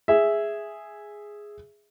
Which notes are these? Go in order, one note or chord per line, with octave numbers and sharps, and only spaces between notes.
G#4 E5